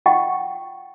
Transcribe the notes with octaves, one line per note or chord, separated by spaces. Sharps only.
F4 D#5 F#5 G5 C#6